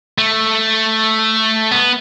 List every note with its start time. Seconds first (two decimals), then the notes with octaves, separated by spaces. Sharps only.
0.18 A3
1.71 B3